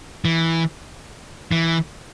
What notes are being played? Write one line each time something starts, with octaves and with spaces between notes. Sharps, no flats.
E3
E3